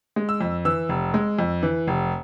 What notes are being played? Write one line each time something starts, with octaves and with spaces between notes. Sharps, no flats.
G#3
E6
F2
E3 E6
F1
G#3
F2
E3
F1